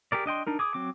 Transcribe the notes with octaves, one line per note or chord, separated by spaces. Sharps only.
G4 G#4 A#4 D5
D4 D#5 G5 C6
D4 D#4 A#4
G#4 D6 D#6
F#3 C4 D6